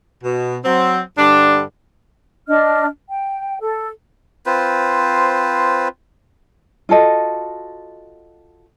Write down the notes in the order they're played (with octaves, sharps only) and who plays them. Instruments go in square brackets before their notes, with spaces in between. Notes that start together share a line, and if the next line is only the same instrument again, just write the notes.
[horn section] B2
F#3 C4
G2 D3 D4
[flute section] D4 D#5 F6
G5
A4
[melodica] C4 F4 B4 C5
[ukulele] F4 F#4 A4 D#5